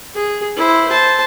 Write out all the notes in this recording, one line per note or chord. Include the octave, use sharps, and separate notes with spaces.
G#4
E4 C5
C5 A5